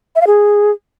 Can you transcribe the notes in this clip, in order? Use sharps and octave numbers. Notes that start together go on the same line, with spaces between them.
E5
F5
G#4